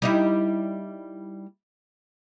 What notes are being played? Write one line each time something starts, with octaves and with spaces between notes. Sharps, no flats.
G3 D#4 E4